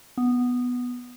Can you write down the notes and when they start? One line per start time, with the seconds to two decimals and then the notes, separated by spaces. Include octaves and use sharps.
0.18 B3